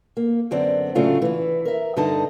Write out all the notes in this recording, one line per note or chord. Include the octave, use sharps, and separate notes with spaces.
A#3
F#2 D3 B3 C4 D5
A2 C#3 F#3 A3 D4 F4
E3 E4
A#4 E5
G2 D3 D#4 A4 D#5 A5